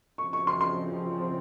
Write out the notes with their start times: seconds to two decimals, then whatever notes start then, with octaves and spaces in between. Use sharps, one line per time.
0.18 C#3 F3 C4 C#6
0.33 C#6
0.47 C6
0.61 C6